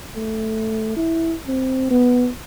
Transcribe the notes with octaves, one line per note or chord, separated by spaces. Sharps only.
A3
E4
C4
B3